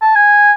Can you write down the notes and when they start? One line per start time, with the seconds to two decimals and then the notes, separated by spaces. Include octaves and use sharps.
0.02 A5
0.15 G#5